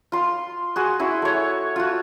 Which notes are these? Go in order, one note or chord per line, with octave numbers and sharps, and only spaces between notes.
F4 C6
F#4 G#4 C6
E4 F#4 C6
A3 C#5
F4 F#4